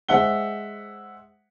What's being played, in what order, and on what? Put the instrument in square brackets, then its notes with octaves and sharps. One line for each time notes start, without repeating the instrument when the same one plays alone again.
[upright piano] G#3 C5 E5 F#5 G7